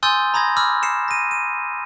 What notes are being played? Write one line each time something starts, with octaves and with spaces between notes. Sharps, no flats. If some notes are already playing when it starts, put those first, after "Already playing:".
G#5 C6 D#6 E6 G6 A6
A#5 B5 D#6 G#6 A#6
B5 D6 E6 F6
C7 C#7 E7
A#6 D#7
D#7